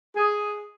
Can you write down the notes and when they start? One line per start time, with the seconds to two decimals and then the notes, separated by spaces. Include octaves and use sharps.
0.17 G#4